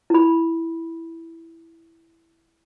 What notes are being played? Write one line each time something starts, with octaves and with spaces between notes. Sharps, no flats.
E4 B5